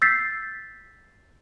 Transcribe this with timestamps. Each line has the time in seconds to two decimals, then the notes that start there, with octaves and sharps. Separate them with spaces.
0.02 E6 G6 A6 B6 C7